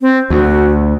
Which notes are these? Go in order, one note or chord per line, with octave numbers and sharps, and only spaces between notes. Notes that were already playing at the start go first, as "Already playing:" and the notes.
C4
D2 F#4